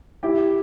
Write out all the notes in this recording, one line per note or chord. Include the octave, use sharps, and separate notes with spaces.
E4 G4